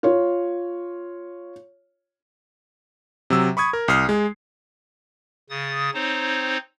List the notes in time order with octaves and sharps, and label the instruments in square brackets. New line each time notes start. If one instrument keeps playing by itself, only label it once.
[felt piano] F4 C#5
[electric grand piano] C3 F#3 E6
B5 C#6 D#6 G#6
A#4
C2 D#6 F6 C7
G#3
[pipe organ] C#3 D#6 A6
C4 D#4 C5 C#5